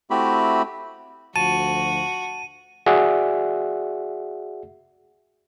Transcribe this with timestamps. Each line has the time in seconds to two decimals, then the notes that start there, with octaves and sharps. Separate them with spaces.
0.10 A3 C4 E4 F#4 G4 B5
1.36 D2 F3 F#4 A5 D#7
2.86 F#4 G#4 D5 E5 F#5